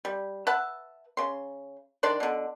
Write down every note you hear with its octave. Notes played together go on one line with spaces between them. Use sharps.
G3
B4 E5 F#5 A5
C#3 C6
D#3 D4 D5 C6
B2 D3